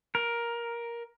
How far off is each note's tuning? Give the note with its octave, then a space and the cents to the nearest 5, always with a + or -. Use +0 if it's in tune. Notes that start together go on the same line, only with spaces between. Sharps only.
A#4 +10